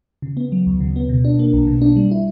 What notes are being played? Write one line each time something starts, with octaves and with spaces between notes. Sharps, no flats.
C#3
B3
F#3
D2
C#3
B3
B2
D4
A#3
B1
B2
D4
G3
E4